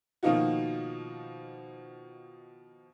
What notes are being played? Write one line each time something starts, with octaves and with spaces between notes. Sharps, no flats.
B2 D#3 F3 A#3 D#4 F#4